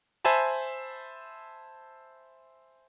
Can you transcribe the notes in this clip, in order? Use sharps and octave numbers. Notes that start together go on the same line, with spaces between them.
C5 E5 G#5 A5 B5